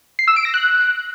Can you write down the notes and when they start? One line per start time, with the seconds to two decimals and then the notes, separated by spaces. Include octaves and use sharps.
0.19 C7
0.28 E6
0.36 D7
0.45 A#6
0.54 F#6